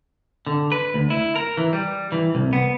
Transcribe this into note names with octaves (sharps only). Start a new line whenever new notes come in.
D3
B4
D2
E4
A#4
E3
G3
E3
C2
B3